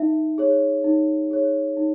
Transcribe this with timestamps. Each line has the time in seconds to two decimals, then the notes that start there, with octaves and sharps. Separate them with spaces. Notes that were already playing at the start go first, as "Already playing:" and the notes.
Already playing: D#4 E5
0.38 G#4 C#5
0.84 D#4
1.31 G#4 C#5
1.77 D#4